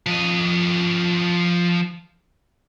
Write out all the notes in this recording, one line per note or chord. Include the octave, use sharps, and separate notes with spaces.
F3 D#5